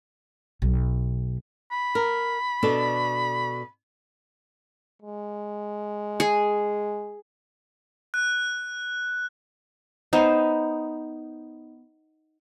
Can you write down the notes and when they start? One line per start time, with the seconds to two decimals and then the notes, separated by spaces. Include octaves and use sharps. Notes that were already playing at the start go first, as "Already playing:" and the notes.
0.62 B1
1.72 B5
1.95 A#4
2.63 B2 D4 A4
5.02 G#3
6.20 G#4
8.14 F#6
10.13 B3 D#4 C5